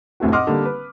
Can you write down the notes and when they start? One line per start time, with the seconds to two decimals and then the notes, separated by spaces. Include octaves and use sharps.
0.20 F1 D2 A2 A3 F#4
0.32 D#5 F#5 C6 D6 F6
0.47 D3 G3 A#3
0.65 B4